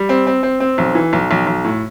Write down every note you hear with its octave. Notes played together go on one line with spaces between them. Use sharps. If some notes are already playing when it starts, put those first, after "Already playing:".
Already playing: G3
C4
C4
C4
C4
B1
E3
B1
B1
B1
A2